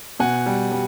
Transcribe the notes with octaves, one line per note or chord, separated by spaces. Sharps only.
B2 F#5 G#5
G3
G3